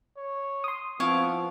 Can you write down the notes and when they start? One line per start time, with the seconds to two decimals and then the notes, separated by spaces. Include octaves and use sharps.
0.17 C#5
0.64 C6 D#6
1.00 F3 B3 C4 E4 F5 C#6